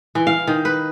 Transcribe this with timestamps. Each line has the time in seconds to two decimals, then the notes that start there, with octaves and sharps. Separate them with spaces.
0.15 E3
0.27 F5
0.47 D#3
0.65 B4